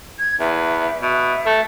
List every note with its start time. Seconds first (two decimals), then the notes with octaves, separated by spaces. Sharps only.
0.19 G#6
0.40 E2 E5
1.02 B2 E5
1.46 A3